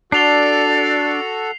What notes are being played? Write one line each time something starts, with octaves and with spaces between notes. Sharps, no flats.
D4 F#4 A4 D5 C7 F7 G7